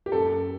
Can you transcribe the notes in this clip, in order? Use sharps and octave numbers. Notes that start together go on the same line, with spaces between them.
G4
F#2 A4